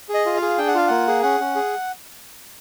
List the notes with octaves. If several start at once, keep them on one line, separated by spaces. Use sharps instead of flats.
G#4
D#5
F4
F5
G#4
D4 G5
F#5
F4 F5
A#3 F#5
G#4
C#4 F#5
C#4
G#4